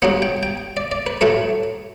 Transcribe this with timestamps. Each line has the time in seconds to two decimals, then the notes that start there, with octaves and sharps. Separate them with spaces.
0.02 G2 F#3 B3 F#5
0.22 G5
0.43 G5
0.77 D5
0.92 D5
1.07 B4
1.21 A2 F#3 A3 B4